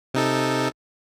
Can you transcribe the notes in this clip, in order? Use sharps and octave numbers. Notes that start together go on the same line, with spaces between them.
C3 D#4 A4